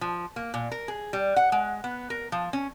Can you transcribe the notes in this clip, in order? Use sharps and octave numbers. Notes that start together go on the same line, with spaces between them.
F3
A#3
A#2
A#4
G#4
G3
F#5
G#3
B3
A#4
F3
C#4